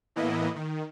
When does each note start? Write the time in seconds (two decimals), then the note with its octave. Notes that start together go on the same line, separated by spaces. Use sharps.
0.16 A2 E3 A#3 B3 E4 D#5
0.56 D#3